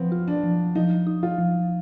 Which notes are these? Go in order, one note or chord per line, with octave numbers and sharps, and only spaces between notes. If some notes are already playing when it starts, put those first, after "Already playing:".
Already playing: F3 B3 C4
F4
D4
F3
F3 D#4
D#4
F4
F3